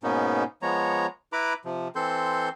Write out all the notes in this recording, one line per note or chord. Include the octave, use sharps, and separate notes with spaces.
G#2 B2 A#3 B3 C#4 D#4
F3 G#3 B3 C#5 A#5
E4 B4 A#5 B5 D6
C3 F3
E3 C4 A4 C6 G6